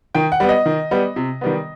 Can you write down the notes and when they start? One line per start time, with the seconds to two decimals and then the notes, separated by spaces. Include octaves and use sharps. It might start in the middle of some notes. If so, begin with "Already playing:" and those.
0.15 D#3 G5
0.32 F#5
0.40 G3 B3
0.49 D#5
0.66 D#3
0.91 G3 B3
1.16 C3
1.41 D#3 G3 B3